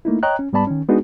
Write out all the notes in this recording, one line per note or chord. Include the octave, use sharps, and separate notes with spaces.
A3 A#3 D#4 E4
C#5 D#5 G5 A#5 F#6
C#4
G#2 G3 B3 D5 A5 B5
D#3 C#4
G#3 B3 D4 D#4 F#4 G#4